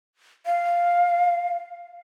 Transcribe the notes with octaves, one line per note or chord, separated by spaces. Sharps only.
F5